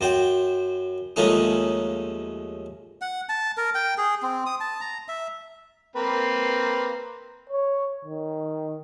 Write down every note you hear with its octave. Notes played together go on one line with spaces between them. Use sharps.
F#2 C5 G5
D#2 F3 G#3 A3 C#4 D#4
F#5
A5
A#4
G5
G#4
C4
D#6
A5
A#5
E5
A#3 C4 B4
C#5
D#3